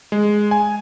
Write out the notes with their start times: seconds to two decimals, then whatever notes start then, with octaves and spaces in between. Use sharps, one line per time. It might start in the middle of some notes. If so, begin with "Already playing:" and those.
0.12 G#3
0.51 G#5